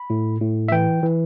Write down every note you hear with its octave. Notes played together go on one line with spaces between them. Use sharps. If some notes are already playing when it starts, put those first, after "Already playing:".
Already playing: B5
A2
A2
E5
E3 G5
E3